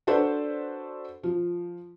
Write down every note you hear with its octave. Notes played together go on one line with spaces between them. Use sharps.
D4 F#4 A4 B4 C5 D5
F3